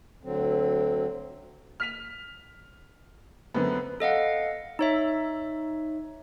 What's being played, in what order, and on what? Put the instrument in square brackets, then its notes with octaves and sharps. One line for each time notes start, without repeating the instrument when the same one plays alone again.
[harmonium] D2 D3 F#3 C4
[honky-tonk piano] F6 B6 F7
[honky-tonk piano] F#2 D3 [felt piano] B3 C4
[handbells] A4 D#5 F5 F#5
D#4 C#5 E5